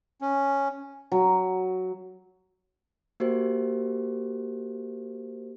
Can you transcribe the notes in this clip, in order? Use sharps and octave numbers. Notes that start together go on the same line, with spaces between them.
C#4
F#3
A#3 F#4 G4 A#4 C5